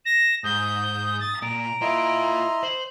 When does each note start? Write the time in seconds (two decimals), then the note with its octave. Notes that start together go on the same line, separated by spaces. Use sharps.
0.05 A#6 E7
0.44 G#2 D#6 G6
1.20 A6
1.42 A#2 A#5 D7
1.82 E4 F4 A#4 D#5 C6
2.63 C5 F#7